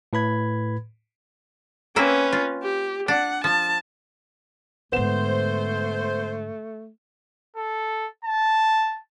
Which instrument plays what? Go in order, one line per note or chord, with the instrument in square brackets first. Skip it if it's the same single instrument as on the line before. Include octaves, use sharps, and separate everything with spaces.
[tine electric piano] A2 B4 B5 G#6
[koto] A#3 C4 E4 [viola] C#4 B4
[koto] F4
[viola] G4
[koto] D4 [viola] F#5
[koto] F3 [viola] A5
[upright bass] G#2 D3 [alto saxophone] A3 [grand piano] B3 F#5 E7 [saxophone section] C5
[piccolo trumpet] A4
A5